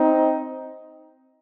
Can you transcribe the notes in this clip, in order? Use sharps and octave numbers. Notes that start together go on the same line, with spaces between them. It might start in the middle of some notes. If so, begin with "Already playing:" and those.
Already playing: C4 D#4